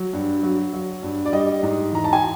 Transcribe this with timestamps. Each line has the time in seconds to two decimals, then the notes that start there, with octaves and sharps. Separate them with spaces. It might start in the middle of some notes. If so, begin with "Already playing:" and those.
Already playing: F#3
0.13 G2
0.43 F#3
0.73 F#3
1.03 G2
1.25 D5
1.33 G3 D#5
1.63 G#2
1.92 E3 A#5
2.04 A5
2.13 G#5